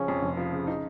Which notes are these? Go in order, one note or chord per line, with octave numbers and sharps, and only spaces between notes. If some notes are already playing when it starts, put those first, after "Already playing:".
Already playing: C#3 F3 C#4
F2
F1
F3
C#3
D#4